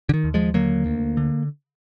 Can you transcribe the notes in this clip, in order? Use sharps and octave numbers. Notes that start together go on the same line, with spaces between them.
D3
D#3
D#2
F3 G#3
D3 F#3 A#3
D2
D3